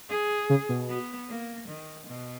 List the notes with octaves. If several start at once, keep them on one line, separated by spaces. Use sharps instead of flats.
G#4
C#3
B2
B3
A#3
D#3
B2